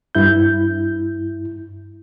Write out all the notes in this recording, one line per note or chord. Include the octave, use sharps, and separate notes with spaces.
G2 E4 G6